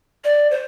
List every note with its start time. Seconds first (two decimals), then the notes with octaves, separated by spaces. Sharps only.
0.24 D5
0.51 C5